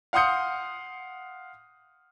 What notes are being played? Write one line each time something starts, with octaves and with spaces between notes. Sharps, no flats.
F5 F#5 C6 D#6 G6 C#7